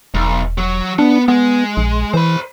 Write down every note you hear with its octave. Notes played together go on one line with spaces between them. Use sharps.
E1 B1
F#3
B3 D4
G#3 B3
A#1
E3 C5 B5